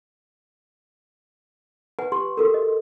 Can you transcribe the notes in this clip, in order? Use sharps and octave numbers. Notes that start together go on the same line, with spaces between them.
B4 F#5 G#5
G4 C6
F#4 A4 A#4
D#5